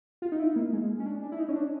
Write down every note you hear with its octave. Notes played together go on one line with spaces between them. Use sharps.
F4
D#4
E4
A#3
G#3
C#4
D4
D4
E4
D#4
C#4
D4